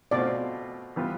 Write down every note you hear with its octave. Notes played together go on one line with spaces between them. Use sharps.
B2 A3 C4 F4 D5
E3 G3 B3 F4